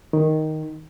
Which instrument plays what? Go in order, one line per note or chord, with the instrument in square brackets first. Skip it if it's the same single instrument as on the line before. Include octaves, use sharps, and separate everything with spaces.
[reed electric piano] D#3